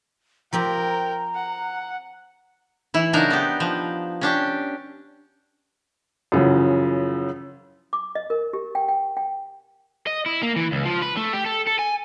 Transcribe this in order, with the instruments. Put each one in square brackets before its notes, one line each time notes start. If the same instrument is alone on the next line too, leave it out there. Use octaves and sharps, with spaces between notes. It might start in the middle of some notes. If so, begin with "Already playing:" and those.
[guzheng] F3 C4 G4 [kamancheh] A#4 G5 [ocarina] A#5
[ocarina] A#5
[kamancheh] F#5
[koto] E3 E4
C#3 F#3 D4 D#4 A#4
B3 G4
F3
C#4 D4 G4
[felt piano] F#2 C#3 E3 F3
[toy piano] D6
D#5
A#4
G4
G5
G5
G5
[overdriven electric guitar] D#5
E4
A#3
E3
C#2
F3
B4
A3
G4
A4
A4
G#5